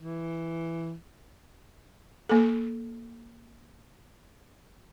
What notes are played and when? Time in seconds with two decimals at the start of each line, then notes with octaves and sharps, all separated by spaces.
0.01 E3
2.29 A#3 A4